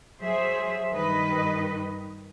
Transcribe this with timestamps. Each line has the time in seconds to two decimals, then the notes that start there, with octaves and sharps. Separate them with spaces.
0.21 F#3 G#4 C5 E5
0.93 G2 D#3 B4 D#5